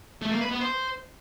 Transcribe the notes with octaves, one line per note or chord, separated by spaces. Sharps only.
A3
A#3
B4
B3
C5